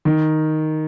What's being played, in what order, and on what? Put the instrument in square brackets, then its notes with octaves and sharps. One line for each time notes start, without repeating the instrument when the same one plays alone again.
[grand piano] D#3